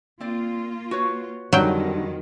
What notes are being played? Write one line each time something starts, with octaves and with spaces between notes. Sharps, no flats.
A#3 C4 F4 D5
F#4 B4 C#5
F2 D3 D#3 F#3 G3 D4 G5